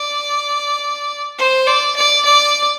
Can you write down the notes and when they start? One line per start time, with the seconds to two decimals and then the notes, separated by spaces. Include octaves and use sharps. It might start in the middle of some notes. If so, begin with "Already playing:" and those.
Already playing: D5
1.38 C5
1.67 D5
1.96 D5
2.25 D5